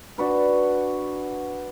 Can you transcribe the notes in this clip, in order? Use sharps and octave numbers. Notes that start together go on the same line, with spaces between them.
D4 F#4 B4